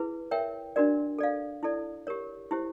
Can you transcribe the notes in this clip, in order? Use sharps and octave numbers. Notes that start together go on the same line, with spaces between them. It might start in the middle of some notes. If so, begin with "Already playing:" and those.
Already playing: E4 G#4 B4
A#4 C#5 E5 G5
D4 F#4 A#4 D5
A4 D5 F5
E4 A4 D5
G4 A#4 C#5
E4 G4 C5